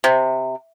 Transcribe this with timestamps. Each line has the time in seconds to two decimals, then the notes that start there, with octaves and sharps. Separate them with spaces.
0.04 C3